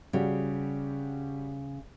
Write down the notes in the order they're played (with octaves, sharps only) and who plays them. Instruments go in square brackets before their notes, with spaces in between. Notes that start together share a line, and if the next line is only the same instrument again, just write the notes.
[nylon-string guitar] C#3 [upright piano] G3 F#4 G4